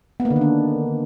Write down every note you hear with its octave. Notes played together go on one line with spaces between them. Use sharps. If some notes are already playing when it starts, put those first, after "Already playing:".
B3
A#3
D3
D#3
D4